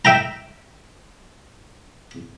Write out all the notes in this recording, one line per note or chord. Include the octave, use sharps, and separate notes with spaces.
E5 G5 A#5